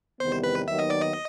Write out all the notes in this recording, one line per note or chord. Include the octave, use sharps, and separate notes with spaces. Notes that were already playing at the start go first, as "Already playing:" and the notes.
E2 C3 D#3 G3 B3 C5
B4
D#2 D#3 F#3 B3 D#4 E5
D#5
D5
D#5